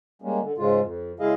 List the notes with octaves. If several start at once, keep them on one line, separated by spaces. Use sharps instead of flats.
G3 G#3 A#3 C#4
D3
G#2 C#3 G#3 F4
F2
C#3 G#3 E4 G#4 D#5 F5